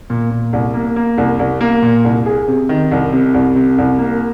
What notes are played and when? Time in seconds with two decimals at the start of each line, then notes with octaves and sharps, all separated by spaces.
0.10 A#2
0.31 A#2
0.53 C2
0.74 A#3
0.96 A#3
1.18 C2
1.39 C2
1.61 A#3
1.82 A#2
2.04 C2
2.26 G#4
2.48 C3
2.69 D#3
2.92 C2
3.13 C3
3.34 C2
3.55 C3
3.78 C2
3.99 A#3